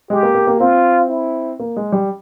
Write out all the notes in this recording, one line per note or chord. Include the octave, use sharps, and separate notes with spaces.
G#3 G4
A#3
A#3
A#3
C4 F4
E4
A#3
G#3
G3